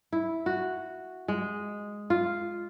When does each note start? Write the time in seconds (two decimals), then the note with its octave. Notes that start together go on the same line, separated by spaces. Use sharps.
0.13 E4
0.46 F#4
1.28 G#3
2.10 F4